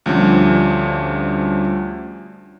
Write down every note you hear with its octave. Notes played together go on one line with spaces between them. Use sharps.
D2 F3 G3 C#4 D4